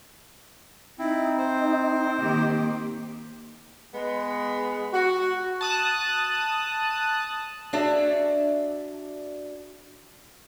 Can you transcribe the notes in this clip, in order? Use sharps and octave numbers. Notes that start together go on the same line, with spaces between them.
C4 D#4 E4
C5
D#3 A#3 G4
G#3 B3
F#4
A5 D#6 F#6
D4 F#4 G#4 D5 E5